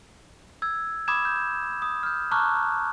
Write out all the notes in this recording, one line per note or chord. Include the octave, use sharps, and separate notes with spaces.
E6 G#6
B5 D6 D#6 G#6 E7
G6
D#6
F6 G6
A5 A#5 C#6 D6 F6 F#6